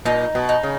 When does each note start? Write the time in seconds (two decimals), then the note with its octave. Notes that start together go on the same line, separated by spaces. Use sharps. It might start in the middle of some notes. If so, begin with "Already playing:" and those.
0.05 A#2 D#4
0.35 B2
0.49 D#4
0.63 C#3